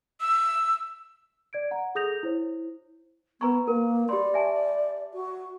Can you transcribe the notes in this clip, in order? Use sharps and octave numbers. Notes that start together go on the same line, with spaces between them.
E6
D5 G#6 D7
F#5 A#5
G#4 A4 D#6 G6 A#6 F7
E4 C5 C#5
B3 B4 A#5 C#6
A#3 A#4
G4 D5 B5 C6
E5 G#5 A5
F#4